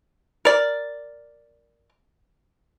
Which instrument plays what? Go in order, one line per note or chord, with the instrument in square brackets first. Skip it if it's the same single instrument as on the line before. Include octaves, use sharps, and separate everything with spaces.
[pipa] A#4 D5